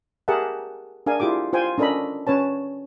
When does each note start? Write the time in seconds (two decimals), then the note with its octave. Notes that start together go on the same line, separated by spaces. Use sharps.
0.28 G4 G#4 A#4 E5 F#5 A5
1.06 D4 G#4 A#4 F5 G#5
1.20 E4 F4 G4 G#4 D6
1.53 F4 C5 G5 G#5
1.78 C#4 D4 A4 A#4 D#5 B5
2.27 C#4 B4 C#5 A5